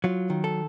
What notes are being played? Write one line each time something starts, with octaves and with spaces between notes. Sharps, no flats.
F#3 F4
D#3
A4